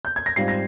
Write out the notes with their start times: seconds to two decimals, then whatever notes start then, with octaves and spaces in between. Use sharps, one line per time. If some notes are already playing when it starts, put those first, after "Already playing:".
0.05 G6
0.16 G#6
0.26 A#6
0.36 G#2 G3 C4 F4 C7
0.48 A#6